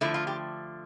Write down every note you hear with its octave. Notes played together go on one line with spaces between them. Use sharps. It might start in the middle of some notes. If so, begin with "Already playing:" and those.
D3 F3 A3 E4
F4
G4